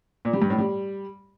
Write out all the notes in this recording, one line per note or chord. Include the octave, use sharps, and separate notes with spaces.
A#2
G3
G2
A2
G3